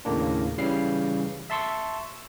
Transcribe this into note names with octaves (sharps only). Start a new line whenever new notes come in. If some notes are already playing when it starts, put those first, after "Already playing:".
D#2 A2 C#3 A#3 D4
C#3 E3 G3 C7
E5 A5 C6 C#6 E6